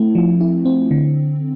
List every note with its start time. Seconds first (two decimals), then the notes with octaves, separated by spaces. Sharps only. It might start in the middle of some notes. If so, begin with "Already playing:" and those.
Already playing: A3 C4 E4
0.15 F3
0.41 E4
0.65 C4
0.91 D3